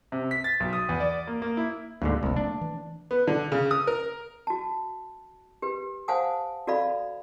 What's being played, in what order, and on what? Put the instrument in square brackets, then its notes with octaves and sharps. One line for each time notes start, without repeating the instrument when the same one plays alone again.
[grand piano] C3
B6
A6
B1
D#6
E2
D5
A#3
A#3
E4
[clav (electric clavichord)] D2 G#2 D3 [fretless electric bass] A#3
[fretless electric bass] E1 G#3 A#3 [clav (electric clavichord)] C2
[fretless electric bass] A3 A#3 [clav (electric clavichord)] D4
[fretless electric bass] E3
[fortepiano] B3
D3
C#3
D#6
A#4
[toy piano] F#4 A5
G4 B4
C5 F5 F#5 G#5 A5 D#6
F#4 A4 D5 F5 B5